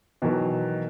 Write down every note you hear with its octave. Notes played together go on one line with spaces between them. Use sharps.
B2 D#3 E3 F#3